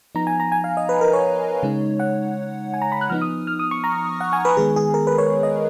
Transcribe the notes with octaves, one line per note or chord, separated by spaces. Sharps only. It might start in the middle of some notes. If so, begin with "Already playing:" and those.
F3 B3 D#4 A#5
G#5
A#5
G#5
F5
D#5
B4
A#4
C#5
C#3 G#3 D#4
F#5
G#5
A#5
B5
F#6
F3 B3 D#4 F6
D#6
F6
D#6
C#6
A#5
F#5
G#5
B4
D#3 G#3 B3 G#4
G#4
A#4
B4
C#5
D#5